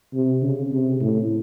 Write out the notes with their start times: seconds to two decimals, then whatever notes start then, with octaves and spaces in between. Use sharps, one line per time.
0.14 C3
0.43 C#3
0.71 C3
1.01 A2